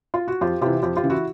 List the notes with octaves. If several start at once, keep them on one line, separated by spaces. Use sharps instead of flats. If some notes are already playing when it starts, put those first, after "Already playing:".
F4
F#4
F2 F4 G4
C3 E3 F4 G4
F2 F4 G4
F4 G4
C#3 E3
E4 F#4